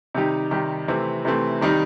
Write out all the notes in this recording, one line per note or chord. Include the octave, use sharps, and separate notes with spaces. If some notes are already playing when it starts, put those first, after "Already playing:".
C3 D#3 G3 D#4 G4
C3 D#3 G3 D#4 G4
C3 E3 A3 C4
C3 E3 A3 C4
C3 D#3 G3 D#4